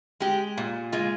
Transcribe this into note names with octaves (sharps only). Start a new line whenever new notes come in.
G#3 G4
A#2
G#3 F4